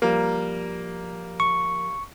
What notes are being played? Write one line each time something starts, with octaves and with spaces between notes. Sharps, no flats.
F3 G3 A#3 A#4
C#6